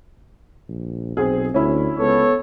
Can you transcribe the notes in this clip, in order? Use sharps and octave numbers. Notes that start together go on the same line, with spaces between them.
A#1
B1 C4 G#4
D2 C#4 E4
C#2 B3 A4 C#5